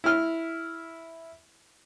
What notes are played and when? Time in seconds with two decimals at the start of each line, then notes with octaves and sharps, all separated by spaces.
0.04 E4 F6